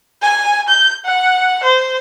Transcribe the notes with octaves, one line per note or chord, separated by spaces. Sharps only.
G#5
G6
F#5
C5